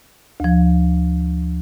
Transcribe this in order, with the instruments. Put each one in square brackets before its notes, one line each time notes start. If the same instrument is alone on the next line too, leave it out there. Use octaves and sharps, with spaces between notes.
[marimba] D2 F3